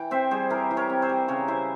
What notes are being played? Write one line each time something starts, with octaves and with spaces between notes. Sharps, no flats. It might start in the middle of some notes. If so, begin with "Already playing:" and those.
Already playing: E3 G5
C4 C5 E5
G3 G#4 C5
E3 G4 A#4
E3
A#4 C#5
C4
C5 E5
G3
C#3 A#4 C#5
E4 C5 E5